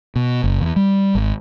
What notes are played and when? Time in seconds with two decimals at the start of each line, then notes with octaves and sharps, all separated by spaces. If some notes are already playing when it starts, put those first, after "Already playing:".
0.16 B2
0.44 F#1
0.60 E2
0.76 G3
1.15 G#1